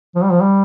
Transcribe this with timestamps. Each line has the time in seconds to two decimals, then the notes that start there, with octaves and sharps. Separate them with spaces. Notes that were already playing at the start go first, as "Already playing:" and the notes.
0.15 F3
0.24 G3
0.32 F3
0.41 G3